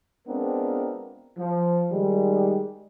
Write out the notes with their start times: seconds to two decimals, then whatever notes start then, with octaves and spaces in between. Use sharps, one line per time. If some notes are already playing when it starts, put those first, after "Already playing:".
0.27 G#3 B3 C4 D4 F4 A#4
1.37 F3
1.91 D#3 G3 G#3